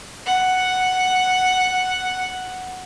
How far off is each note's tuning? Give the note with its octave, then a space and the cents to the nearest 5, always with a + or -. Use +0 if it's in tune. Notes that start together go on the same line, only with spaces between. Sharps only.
F#5 +0